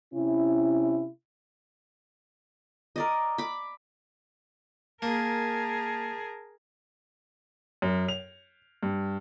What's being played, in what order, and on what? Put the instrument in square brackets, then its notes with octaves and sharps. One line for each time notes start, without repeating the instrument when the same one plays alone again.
[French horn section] C3 C#4 E4
[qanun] A#4 D5 D#5
B5 D6
[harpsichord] A#3 [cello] G#4 A#4 [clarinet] A5
[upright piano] F#2
F7
G2